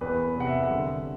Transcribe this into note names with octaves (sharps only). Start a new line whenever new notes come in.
E2 B4
C3 F#5
E5
F#5
D3 E5